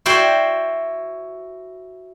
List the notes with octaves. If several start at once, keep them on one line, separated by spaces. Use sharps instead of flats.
E4 F#4 C5 D5 G5